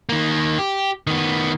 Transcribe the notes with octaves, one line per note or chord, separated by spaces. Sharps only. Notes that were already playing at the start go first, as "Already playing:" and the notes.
D#3 A#3
G4
D#3 B3